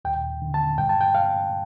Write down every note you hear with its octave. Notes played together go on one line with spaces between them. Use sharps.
D#2 G5
D3
A5
G2 G5
A5
G5
F5